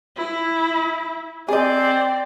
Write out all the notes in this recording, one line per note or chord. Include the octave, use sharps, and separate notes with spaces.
E4
C4 G#4 D5 D#5